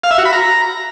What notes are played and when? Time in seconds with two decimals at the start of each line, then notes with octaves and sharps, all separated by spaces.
0.04 F5
0.11 E5
0.18 F#4
0.25 B5
0.33 A#5